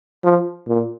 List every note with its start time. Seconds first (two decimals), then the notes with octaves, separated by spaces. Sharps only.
0.24 F3
0.68 A#2